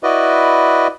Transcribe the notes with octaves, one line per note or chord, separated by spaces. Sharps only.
E4 F#4 B4 D5 D#5